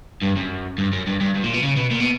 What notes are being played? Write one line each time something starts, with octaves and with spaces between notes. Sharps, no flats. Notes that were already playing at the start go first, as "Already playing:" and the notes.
G2
F#2
G2
F#2
G2
G2
G2
A#2
B2
C#3
B2
A#2
B2